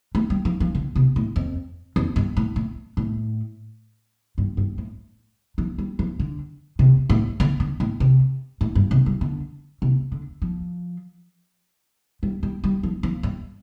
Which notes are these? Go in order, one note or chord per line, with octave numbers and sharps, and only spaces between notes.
A3
G3
F3
F3
D3
C3
A2
F2
F2
G2
A2
A2
A2
G2
G2
A2
F3
G3
F3
D3
C3
A2
D3
D3
A2
C3
A2
G2
C3
G3
D3
C3
D3
F3
G3
G3
G3
F3
F3
G2